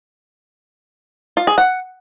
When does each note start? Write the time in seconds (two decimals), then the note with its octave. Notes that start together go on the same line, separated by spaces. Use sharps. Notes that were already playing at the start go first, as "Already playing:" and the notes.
1.37 F4
1.47 G#4
1.58 F#5